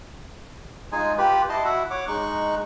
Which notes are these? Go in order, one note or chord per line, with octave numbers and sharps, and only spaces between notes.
G#3 D#4 F4 G#4 G#5
F4 G4 B4
E4 D#5 A5 C6
E4 F#4 E5 F#5
C#5 F#5 D6
G#3 D#4 C#6 F#6